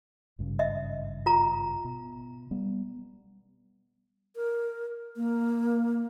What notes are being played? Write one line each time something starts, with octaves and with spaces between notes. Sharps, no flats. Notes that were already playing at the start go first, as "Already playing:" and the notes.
G#1 G2 C#3
D#5 E5
F4 A#5
B2
G3 B3
A#4
A#3